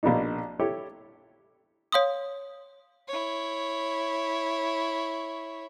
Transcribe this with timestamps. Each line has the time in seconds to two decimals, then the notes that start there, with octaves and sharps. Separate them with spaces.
0.03 A#1 B2 A#3 D4 D#4
0.60 E4 G4 A4 C#5
1.92 C#5 F5 C6 D#6
3.08 E4 C#5